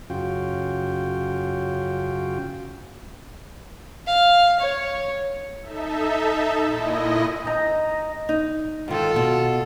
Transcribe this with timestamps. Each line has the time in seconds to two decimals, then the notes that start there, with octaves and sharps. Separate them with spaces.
0.10 F#2 C#3 F4 F#4 G5
4.07 F5
4.60 C#5
5.62 D#4 A4 E5
6.62 A#2 E4 D#5
7.46 D#4 A#5
8.29 D#4
8.88 G#2 D#3 F4 A4
9.16 B2